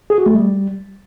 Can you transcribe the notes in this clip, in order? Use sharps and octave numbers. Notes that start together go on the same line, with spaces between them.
G#4
F#4
A3
G3